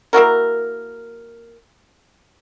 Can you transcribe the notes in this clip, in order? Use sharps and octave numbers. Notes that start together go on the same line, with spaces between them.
A#3 E4 F#4 A#4